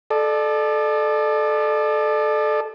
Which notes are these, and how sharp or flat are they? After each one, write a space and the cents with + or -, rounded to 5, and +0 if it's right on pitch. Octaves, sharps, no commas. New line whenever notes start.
A4 -20 D5 +35